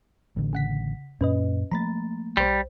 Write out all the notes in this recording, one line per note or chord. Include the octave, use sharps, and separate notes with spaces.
A1 D3
C#3 F#5 B6
F#2 A#2 C#4 B4 D#5
F3 A3 A#3 A#5 B5 A6
B1 G3 C5